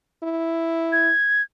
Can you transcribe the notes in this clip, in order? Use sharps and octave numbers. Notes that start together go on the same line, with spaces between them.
E4
G#6